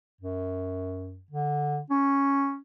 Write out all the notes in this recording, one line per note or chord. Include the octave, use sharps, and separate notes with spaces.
F#2
D3
C#4